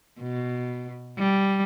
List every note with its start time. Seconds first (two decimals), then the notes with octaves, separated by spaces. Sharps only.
0.21 B2
1.18 G3